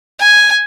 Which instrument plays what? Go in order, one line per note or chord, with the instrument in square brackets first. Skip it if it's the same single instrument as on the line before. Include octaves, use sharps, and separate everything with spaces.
[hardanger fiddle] G#5